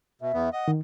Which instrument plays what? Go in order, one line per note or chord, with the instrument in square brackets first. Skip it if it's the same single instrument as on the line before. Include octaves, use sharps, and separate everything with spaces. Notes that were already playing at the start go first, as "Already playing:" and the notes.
[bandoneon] B2 [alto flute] E5
[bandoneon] E2 B3
[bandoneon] D#5 [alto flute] F#5
[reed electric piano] D#3